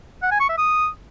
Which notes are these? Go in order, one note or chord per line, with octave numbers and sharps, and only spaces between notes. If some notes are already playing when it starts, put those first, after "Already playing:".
F#5
G#5
C#6
E5
D#6